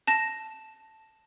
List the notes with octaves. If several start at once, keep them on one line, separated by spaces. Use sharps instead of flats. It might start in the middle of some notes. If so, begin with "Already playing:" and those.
A5 A#6 E7